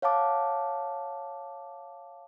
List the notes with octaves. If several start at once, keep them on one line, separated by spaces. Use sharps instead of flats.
C#5 F5 F#5 A5 D6